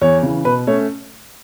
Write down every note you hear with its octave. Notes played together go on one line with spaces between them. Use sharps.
E2 C#5
C#3 E3
B2 B4
A3 C#4 C#5